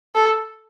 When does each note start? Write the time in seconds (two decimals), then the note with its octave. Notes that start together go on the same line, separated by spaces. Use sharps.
0.15 A4